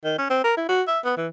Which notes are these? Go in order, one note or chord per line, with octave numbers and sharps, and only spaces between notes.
D#3
C#4
C4
A#4
E4
F#4
E5
B3
E3